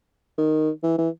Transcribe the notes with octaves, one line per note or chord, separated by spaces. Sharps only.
D#3
E3
E3